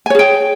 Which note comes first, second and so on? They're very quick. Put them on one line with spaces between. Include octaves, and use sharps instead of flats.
G#5 C#5 G#4 G5